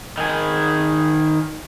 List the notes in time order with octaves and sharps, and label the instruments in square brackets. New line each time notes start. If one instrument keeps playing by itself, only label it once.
[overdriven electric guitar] D#3 G#4